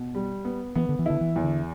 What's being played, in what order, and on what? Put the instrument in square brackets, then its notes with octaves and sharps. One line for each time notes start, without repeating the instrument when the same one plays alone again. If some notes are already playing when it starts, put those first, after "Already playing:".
Already playing: [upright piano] B2
G3
B3
[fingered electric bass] E3 [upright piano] B3
[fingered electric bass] D3
E3
[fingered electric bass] D3 [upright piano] E4
[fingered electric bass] E3
[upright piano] E2
[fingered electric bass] D3